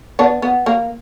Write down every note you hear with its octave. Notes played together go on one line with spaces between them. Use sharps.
B3 D4
B3
A#3